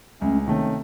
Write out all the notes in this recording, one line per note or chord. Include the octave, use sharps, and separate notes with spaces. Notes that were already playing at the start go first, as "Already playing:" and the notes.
C#2 A3 C#4
C3 D#3 A3 C#4